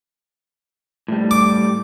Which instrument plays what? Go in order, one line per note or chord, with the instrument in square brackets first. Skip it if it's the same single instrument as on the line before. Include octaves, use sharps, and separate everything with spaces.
[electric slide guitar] A2 G3
[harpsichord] D6